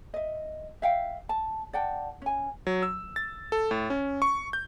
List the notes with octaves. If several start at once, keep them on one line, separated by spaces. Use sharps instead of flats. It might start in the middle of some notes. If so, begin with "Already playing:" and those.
D#5 E5
E5 F5 G5
A5
D5 F#5 G5 A5
C#4 G#5
F#3
E6
A6
A4
A2
C#4
C#6
G6